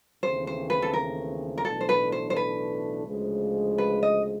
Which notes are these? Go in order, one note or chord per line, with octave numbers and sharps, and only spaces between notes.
D#2 C#3 E3 A3 C4 C5
C5
B4
A4
A#4
A#4
B1 A2 E3 A3 D4 A4
C5
B4
C5
C5
B4
D2 C#3 F3 G#3
B4
D#5